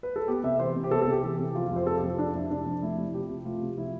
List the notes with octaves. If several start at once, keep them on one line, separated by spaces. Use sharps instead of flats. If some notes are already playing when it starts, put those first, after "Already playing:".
B4
A4
B3 G4
C3 E5
E3 C5
C3
G4
B3 A4
A4
C3
G4
E3
C3
F3 F4
F4
F2
C5
C3 A4
G4
F2
F4
F3 D4
F2 E4
C3 D4
F2
A3 E4
C3
F3 G4
C3
A3 F4
C3
F3 E4